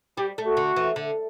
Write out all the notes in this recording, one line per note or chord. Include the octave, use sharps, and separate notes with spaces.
G3 G4
A3
F#4
D3
E3
D3